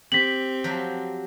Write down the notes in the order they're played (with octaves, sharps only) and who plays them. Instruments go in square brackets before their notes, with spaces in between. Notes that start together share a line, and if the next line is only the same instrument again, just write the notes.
[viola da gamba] C4 [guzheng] G4 [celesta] B6 F#7
[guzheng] F3 F#3 G4